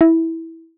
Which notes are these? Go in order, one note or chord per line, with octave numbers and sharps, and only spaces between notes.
E4